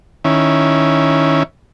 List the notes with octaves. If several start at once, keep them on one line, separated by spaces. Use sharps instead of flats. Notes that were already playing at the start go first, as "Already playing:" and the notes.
D#3 C#4 E4